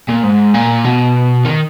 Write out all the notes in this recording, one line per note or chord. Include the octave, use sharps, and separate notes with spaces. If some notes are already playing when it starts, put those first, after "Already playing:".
A#2
G#2
A#2
B2
D#3